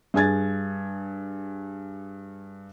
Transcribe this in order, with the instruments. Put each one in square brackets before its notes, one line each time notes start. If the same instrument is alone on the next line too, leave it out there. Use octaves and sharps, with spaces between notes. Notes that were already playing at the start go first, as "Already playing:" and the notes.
[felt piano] G2 G#4 G#5 G#6 A6